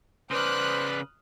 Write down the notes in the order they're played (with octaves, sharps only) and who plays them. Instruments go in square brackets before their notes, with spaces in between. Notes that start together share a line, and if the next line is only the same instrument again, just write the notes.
[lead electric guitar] C#3 D5 [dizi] B4 [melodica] C5 [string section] D#6 F6 F#6